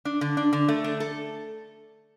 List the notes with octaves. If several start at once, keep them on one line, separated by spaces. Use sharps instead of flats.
D4
D3
D4
D3
A3
D4
A4